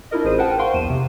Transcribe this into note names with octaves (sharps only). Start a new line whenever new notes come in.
D4 E4 F4 A#4 D#5
A1 G#4 C5 D#7
A#4 B4 F#5 G5 A5
C5 F5 G5 C6 C#6
A#1 E2 D#7 E7
C3